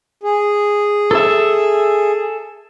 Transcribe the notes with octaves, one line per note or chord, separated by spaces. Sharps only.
G#4
A4 E5